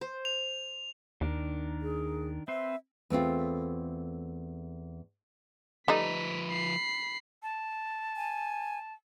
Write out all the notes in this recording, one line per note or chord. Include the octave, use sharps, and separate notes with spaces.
C5
F7
D#2 D#3 D4 A#4
G#4
C4 B4 C5 E5
E2 A3 C4 F4
F3 G3 A3 D#4 B4 B6
B5 C7
A5
G#5